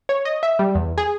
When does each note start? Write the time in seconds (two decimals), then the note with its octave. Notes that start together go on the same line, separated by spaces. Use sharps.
0.09 C#5
0.25 D#5
0.43 E5
0.59 G3
0.75 E2
0.98 G#4